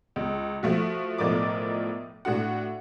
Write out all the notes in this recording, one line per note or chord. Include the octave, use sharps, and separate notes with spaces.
C#2
F3 A3 F#4
B1 A2 F3 A#4 D5 D6
A2 D4 F#4 F#5